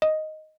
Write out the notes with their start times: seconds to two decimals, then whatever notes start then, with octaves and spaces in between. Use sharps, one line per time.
0.02 D#5